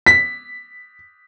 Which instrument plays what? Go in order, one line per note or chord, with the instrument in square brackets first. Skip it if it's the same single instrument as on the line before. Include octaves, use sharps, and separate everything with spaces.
[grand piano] B6